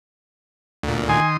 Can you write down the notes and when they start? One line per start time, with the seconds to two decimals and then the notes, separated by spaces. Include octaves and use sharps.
0.83 D2 A#2
1.09 D#3 G#5 C6 D#6